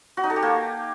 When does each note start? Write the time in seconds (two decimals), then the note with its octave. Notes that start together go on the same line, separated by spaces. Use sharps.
0.17 F#4
0.24 D#4
0.30 A4
0.36 G4
0.42 A#3